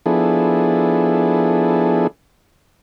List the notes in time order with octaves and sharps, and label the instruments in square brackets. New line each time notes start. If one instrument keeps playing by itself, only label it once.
[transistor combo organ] F3 B3 D4 E4 G#4 A4